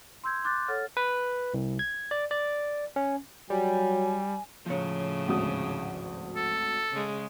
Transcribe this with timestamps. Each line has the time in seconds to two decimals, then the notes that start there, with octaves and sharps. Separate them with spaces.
0.24 C6 E6 G6 G#6
0.44 C6 D6 F#6 G6 A6
0.68 A4 C#5 F#5 F6 A6
0.97 B4
1.54 C2
1.79 G#6
2.11 D5
2.31 D5
2.96 C#4
3.50 F#3 G3 G#5
4.66 A2 C#3 F3 C#5
5.28 G#1 D2 D#6
6.36 A4
6.92 C#3 G#3